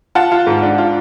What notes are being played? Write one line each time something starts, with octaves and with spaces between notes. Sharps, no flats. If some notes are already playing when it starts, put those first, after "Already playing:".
F4 F#5 A5
F4
G#2
D4
F4